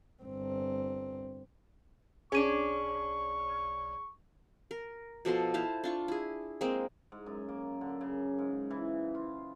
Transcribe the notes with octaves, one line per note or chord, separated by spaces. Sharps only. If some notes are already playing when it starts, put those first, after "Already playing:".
G1 C4
B1 C#4 D4 G#4 C#6 D#7
A#4
B2 F3 A4 C6
E4 C5 F5 A5
D4 F4 C#6
E4 G#4
G#3 A#3 C4
G#2
F#2
A#3
D3
C#3
G#2
E3
F4